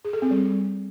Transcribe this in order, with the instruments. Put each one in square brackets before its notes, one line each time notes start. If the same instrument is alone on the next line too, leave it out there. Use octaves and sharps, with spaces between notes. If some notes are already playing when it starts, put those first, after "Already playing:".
[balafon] G#4
A4
C4
G3